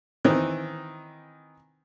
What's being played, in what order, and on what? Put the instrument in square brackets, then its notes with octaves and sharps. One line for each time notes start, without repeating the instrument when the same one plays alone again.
[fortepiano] D#3 E3 C4